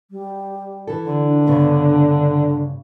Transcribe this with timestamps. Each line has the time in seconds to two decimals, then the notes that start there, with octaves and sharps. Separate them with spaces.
0.11 G3
0.87 E3 A4
1.05 D3
1.23 D4
1.47 G2 C#3 B3